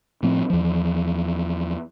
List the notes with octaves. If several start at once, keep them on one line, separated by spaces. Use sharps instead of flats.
A2 F3 C4
E2 F3